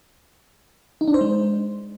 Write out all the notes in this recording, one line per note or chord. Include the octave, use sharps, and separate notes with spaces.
D#4
D4
C5
G#3